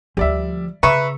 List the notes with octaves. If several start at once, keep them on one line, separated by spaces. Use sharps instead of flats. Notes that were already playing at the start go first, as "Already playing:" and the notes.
D2 F3 G3 D5 E5
C#3 B4 E5 A#5 C#6